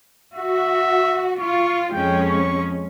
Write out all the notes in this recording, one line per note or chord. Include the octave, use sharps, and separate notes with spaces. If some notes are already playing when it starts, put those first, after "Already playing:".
F#4 E5
F4 C#6
F2 G#3 C#4 G5
C#6